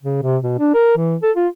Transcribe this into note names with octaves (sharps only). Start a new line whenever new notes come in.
C#3
C3
B2
D4
A#4
E3
A4
F4